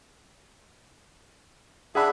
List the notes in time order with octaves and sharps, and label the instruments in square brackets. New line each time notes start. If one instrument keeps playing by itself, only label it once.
[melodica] D4 E5 [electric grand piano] G#4 F#5 B5